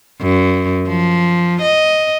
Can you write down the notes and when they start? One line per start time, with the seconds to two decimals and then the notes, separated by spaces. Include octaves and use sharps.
0.22 F#2
0.88 F3
1.62 D#5